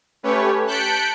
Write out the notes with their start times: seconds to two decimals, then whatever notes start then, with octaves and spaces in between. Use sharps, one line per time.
0.23 A3 C#4 G4 B4 C#5
0.66 A5 F#6 G6 B6 C#7 D7